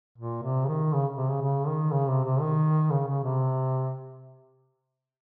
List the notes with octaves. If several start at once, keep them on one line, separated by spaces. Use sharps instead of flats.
A#2
C3
C#3
D#3
C#3
C3
C#3
C#3
D#3
C#3
C3
C3
D#3
C#3
C#3
C3